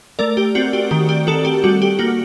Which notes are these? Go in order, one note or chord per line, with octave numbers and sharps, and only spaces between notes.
A3 A#4 D5
G4
C4 F#4
G4
D#3 G4
G4
D#3 F#4 A4
G4
G3 F#4
G4
A#3 F#4